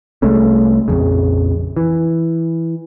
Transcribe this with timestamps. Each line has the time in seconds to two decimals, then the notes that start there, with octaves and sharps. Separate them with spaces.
0.22 C2 G#3 A3 C#4
0.88 A#1 F2 C#3
1.77 E3